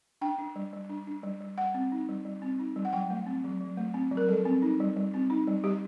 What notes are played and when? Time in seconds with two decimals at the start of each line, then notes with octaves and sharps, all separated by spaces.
0.21 D4 G5
0.39 D4
0.56 G3
0.73 G3
0.89 D4
1.07 D4
1.23 G3
1.41 G3
1.58 G3 F#5
1.74 C4
1.92 D#4
2.08 G3
2.25 G3
2.42 C4
2.60 D#4
2.76 G3
2.85 F#5
2.93 F#3 G5
3.10 A3
3.26 C4
3.44 F#3
3.61 F#3
3.77 A3
3.94 C4
4.11 F#3
4.17 A#4
4.28 G3 A4
4.45 C4
4.62 D#4
4.80 G3
4.96 G3
5.14 C4
5.30 D#4
5.47 G3
5.64 G3 G4